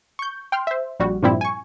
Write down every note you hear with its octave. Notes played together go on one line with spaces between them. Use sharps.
C#6 G6
G5 C6 F6
C5 E5
A#1 G3 F#4
G2 A#2 F3 G3 C4 E4
G#5 C#6